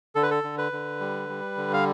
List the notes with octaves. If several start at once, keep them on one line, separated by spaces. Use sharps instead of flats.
D3 A4
B4
A4
D3
B4
D3
G3
G3
D3
F5